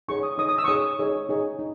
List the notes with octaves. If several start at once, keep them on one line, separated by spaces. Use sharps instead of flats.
D#4 G#4 C#5 C#6
D#6
D#4 G#4 C#5 D#6
D#6
E6
C#6
D#4 G#4 C#5 D#6
D#4 G#4 C#5
D#4 G#4 C#5
D#4